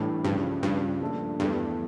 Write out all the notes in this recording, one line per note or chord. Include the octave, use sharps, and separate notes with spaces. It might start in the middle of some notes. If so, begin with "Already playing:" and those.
Already playing: A2 E3 G3 D4
C#2 G2 C#3 F3
C#2 G2 C#3 F3 C#4
A#2 F3 A3 D4 A4
E2 G2 E3 A3